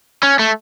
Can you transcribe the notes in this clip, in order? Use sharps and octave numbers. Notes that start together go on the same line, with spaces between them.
C#4
A3